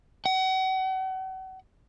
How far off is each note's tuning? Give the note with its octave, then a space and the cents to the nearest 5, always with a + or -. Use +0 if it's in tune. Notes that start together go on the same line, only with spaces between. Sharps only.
F#5 +35